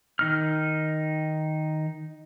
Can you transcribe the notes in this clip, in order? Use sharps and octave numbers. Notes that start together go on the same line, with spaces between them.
D#3 D#4 F6